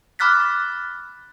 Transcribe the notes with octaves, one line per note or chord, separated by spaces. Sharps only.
B5 D6 F6 F#6 A6 B6